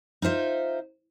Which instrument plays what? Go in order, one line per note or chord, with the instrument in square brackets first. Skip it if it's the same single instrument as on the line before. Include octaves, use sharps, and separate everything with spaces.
[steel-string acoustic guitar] D#4 F4 C5 E5